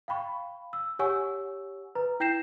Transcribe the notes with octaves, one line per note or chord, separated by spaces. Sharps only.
F5 G5 B5 C#6
E6
G4 C#5 F#5 G#5 C#6 E6
B4 A#5
E4 G5 G6 A#6 C7 E7